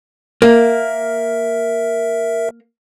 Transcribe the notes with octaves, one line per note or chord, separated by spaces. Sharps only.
A#3 A#4 E5